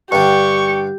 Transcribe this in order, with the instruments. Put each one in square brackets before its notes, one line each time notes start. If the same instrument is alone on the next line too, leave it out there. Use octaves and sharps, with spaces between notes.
[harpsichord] G2 D3 [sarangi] G4 [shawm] C#6